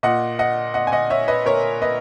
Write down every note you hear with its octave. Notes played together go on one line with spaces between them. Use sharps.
A#2 D#5 F#5
D#5 F#5
D#5 F#5
G#5
D#5 F#5
C#5 E5
B4 D#5
A#4 C#5
B4 D#5